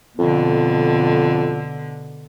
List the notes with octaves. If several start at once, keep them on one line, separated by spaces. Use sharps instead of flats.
F2 B2 D3